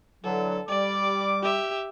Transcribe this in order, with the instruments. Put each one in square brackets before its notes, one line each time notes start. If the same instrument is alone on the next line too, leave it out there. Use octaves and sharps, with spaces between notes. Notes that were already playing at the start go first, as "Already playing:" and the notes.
[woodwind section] D3 E3 F#3 [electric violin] A4
[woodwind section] G3 [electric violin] D5 [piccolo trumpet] D6
[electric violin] G4 E5